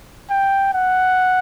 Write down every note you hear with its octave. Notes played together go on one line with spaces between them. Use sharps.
G5
F#5